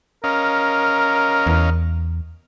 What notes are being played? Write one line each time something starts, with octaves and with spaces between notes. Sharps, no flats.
C#4 A#4 D#5 F5
E2